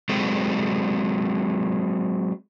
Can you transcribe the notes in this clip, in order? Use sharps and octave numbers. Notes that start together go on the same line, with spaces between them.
F#3 G#3 C4 A4